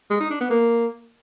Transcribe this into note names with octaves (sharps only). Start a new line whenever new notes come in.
G#3
D#4
D4
B3
A#3